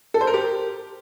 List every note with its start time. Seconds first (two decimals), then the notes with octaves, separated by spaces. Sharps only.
0.14 A4
0.21 C5
0.27 A#4
0.34 G4